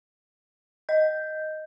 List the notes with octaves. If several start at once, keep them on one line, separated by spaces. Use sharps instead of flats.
D#5 G6